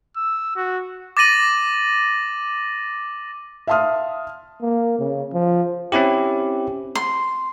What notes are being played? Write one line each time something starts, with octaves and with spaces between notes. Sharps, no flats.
E6
F#4
D6 A6 A#6 D#7 F#7
E5 F5 A5 C6 D#6 F6
A#3
C#3
F3
C4 C#4 E4 G4
C6